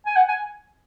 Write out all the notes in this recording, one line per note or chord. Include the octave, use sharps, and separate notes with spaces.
G#5
F#5
G#5